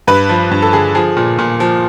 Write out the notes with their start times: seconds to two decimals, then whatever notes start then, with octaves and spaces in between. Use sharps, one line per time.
0.07 G2 B4
0.29 F3
0.51 G2
0.62 A4
0.73 D3 G#4
0.95 F3 G#4
1.17 A#2
1.39 A#2
1.60 F3